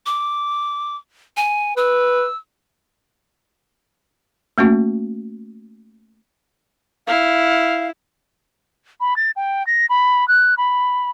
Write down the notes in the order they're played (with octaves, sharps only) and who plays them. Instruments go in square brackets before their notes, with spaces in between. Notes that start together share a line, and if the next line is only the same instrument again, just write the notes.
[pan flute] D6
G#5
[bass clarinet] B4 [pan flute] E6
[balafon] A3 A#3 C#4 F#4
[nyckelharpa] E4 [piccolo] F5
[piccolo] B5
A6
G5
A#6
B5
F#6
B5